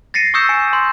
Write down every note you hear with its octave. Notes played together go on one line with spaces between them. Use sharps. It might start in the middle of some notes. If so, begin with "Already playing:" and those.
A6 A#6 C7 C#7 D#7
C#6 D#6 E6 G6 C#7 E7
G#5 C#7
C6